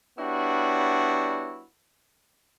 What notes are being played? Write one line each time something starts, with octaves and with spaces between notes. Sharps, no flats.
G3 B3 D4 E4 F#4 C#5